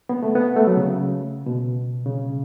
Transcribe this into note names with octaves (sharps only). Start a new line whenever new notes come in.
B3
A3
B3
A3
F#3
C#3
B2
C#3